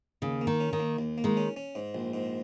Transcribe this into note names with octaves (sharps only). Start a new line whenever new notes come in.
D#2 C#3
A#3
D#3
C#4
D#3
A#3
D#2
A#3
D#3 G#3
C#4
C#4
G#2
A#1
G#2